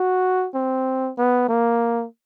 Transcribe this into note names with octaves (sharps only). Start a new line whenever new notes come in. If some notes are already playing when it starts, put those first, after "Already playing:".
Already playing: F#4
C4
B3
A#3